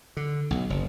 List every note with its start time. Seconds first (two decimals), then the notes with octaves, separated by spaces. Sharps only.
0.17 D3
0.51 B1
0.70 F#1